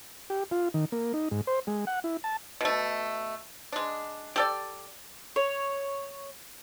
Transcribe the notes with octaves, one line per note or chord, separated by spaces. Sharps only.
G4
F4
D#3
A#3
D#4
G#2
C5
G#3
F#5
E4
A5
B2 A3
G#3 D4
G4 A4 D5
C#5